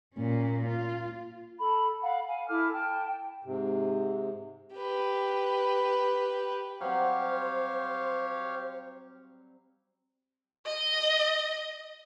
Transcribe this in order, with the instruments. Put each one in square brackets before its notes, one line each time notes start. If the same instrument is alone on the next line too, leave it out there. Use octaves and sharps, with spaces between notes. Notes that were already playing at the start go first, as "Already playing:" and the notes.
[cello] A#2 C#4
F4
[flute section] A4 B5
F5 F#5 B5
F5 G#5
E4 A4 D6 F6
G5 A5
[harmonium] G#2 C3
[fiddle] G4 B4
[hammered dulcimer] F#3 G3 C4 [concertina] G4 C#5 F5 [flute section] C5
[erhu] D#5